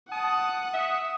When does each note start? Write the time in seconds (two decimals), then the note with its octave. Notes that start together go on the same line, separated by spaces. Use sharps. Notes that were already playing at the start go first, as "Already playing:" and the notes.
0.11 F#5 A5 D#6
0.74 E5